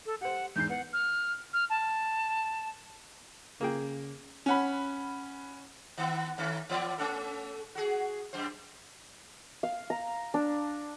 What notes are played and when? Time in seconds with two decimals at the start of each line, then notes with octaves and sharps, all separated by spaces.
0.06 A4
0.21 G4 C5 F#5
0.56 E2 G#2 G6 C7
0.69 B3 F#5
0.93 F6
1.53 F6
1.70 A5
3.61 C#3 A#3 G#4 G5
4.46 C#4 F#5 B5
5.97 D#3 B3
6.38 D#3 A3 C#4
6.69 E3 B3 D5
6.98 A3 C#4 A4
7.75 F#4 G#4
8.33 F#2 C5
9.63 F5
9.90 A#5
10.34 D4